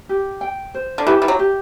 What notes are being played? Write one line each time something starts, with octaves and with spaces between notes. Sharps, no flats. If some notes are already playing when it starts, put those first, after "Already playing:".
G4
G5
C5
D3
E3 G4
E3
F#3
G4